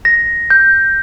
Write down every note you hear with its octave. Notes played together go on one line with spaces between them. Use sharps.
A#6
G6